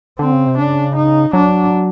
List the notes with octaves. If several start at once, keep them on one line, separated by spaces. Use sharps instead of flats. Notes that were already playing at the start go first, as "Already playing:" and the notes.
D3 C4
C#3
C3
C#3 D4
D#4
F#3 D4